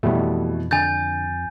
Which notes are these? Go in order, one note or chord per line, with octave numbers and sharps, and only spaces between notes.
F2 B2 E3 G3 A3
D3 G#5 G6 A6